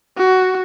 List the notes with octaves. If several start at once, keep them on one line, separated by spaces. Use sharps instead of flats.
F#4